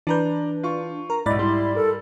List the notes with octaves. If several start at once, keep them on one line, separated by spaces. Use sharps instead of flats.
E3 D4 B4 D5 A#5 G6
F4 C#6
A#4 A#5
B1 G#2 E4 D5 D#5 B5 A6
G3 E4 C6
A4 A#4